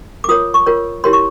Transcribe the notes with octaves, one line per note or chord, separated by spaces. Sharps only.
D6
F4 A#4 C#5 D#6
C#6
F4 A#4 C#5
E4 G4 A#4 C#5 C6
C#6